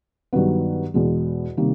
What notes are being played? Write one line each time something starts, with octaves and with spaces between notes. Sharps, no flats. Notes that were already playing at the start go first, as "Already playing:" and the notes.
G2 D#3 F#3 B3
E2 B2 G#3
C3 D#3 G3 A#3